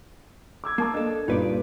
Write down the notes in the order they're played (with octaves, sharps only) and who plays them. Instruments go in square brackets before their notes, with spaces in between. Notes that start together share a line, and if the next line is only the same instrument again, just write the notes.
[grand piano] D6 E6 G#6
[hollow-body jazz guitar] A#3 [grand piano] A#4 A5 D6
[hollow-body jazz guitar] D4 A4 [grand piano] D#5
[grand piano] G2 A#2 D4 [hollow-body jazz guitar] D#4 B4 D5